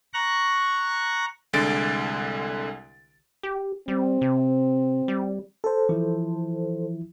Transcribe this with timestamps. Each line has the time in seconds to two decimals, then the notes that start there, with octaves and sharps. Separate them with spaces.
0.14 A#5 C#6 F#6
1.53 C2 D3 G#3 A6 D7
3.43 G4
3.88 G3 C4
4.21 C3
5.08 G3
5.64 A4 C5
5.89 E3 F3 E4